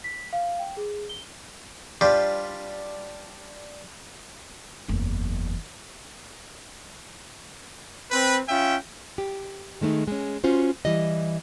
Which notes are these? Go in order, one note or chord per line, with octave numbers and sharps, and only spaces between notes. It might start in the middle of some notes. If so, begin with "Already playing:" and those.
B6
F5
G5
G#4
G7
G3 D4 F4 G4 B4 C5
F#1 E2
C4 B4
C#4 F4 E5 G5
G4
D#3 G#3 A3 D4 D#4
G#3 C#4
C#4 F4 F#4 C5
E3 G3 D#5